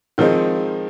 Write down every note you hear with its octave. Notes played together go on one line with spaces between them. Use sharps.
D#3 F3 G#3 C4 D#4